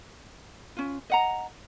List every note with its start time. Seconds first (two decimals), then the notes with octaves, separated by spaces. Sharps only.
0.77 C#4 F4
1.10 D#5 F#5 A#5